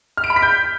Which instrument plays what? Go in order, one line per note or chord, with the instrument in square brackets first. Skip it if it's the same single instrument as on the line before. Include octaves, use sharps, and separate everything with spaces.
[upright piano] F6
D7
B5
B6
G6